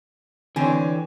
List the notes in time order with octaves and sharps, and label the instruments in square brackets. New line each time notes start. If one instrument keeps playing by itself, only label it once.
[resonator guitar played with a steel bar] D3 C4 [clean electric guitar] E3 [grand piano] C#5 G#5